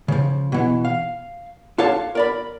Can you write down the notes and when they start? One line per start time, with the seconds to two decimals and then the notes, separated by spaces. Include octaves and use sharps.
0.08 C#3 F3
0.52 B2 E3
0.85 F5
1.78 D4 F4 A4 C#5 F5 A5
2.15 A#4 D5 B5